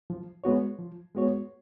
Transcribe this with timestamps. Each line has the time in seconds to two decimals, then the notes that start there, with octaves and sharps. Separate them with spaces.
0.10 F3
0.44 G#3 B3 F#4 C#5
0.78 F3
1.15 G#3 B3 F#4 C#5